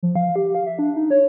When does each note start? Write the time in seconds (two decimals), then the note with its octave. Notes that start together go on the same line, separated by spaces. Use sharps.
0.03 F3
0.16 F5
0.36 G4
0.55 F5
0.66 E5
0.79 D4
0.96 D#4
1.11 C#5